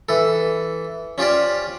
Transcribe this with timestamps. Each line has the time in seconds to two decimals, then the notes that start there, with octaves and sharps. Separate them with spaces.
0.09 E3 A4
1.18 C#4 F4 G4 C5 D5